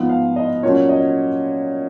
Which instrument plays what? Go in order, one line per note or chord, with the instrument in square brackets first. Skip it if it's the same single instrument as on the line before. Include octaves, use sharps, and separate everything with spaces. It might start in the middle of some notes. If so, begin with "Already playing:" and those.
Already playing: [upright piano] G#2 F3 B3 F4
F5
D#5
A#2 F#3 C#4 C#5
D#5